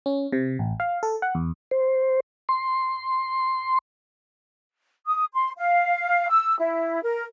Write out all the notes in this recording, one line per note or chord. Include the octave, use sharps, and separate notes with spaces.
C#4
C3
A1
F5
A4
F#5
E2
C5
C6
D#6
C6
F5
E6
E4
A#4